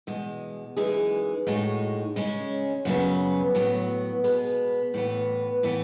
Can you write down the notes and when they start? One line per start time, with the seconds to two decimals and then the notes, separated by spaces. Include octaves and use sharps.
0.07 E2 B2 G#3
0.77 F#2 E3 G#3 D#4 G#4
1.47 A2 G#3 D#4 F#4
2.16 C#3 G#3 C#4
2.85 F#2 C#3 F#3 B3
3.55 A2 F#3 B3
4.24 B2 G#3 B3
4.94 A2 E3 B3
5.63 A2 E3 B3